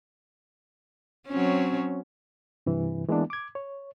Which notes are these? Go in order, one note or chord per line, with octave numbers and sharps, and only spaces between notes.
F#3 C4 C#4
G2 C3 E3
E3 G#3 A#3 B3 D4
D6 G#6
C#5